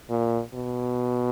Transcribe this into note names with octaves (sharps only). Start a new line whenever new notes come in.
A#2
B2